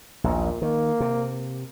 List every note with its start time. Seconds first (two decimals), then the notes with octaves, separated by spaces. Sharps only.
0.24 A#1 D#2 A#2
0.62 D#3 A#3
1.00 C3